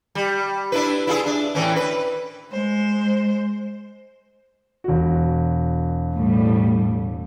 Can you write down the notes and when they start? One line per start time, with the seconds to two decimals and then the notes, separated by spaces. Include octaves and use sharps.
0.15 G3
0.72 D4 E4 B4
1.07 E4 F4 G#4
1.26 D4
1.55 A2 E3 C#4
1.76 B4
2.51 G#3 C5
4.84 E1 F#4
6.14 A2 G3